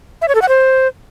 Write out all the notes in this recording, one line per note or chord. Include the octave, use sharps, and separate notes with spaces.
E5
C#5
A4
F#5
C5